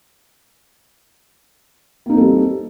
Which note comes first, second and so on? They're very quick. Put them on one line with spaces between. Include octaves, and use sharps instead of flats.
A#3 D#4 C4 A4 G3